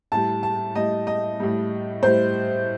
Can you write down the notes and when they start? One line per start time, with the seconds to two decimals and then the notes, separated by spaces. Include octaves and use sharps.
0.12 A2 G3 A5
0.43 A5
0.75 A2 G3 D#5
1.07 D#5
1.40 A2 G3
2.03 A2 G3 C5